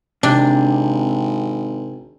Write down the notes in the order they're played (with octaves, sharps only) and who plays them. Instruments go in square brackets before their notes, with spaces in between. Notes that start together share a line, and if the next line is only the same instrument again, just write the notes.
[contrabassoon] G#1 [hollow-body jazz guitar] C3 [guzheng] D4